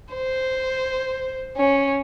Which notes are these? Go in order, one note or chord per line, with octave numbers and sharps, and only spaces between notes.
C5
C#4